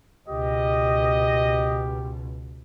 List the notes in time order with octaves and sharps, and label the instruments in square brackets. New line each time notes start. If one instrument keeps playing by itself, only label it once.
[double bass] C#2 B2 [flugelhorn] G4 [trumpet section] D#5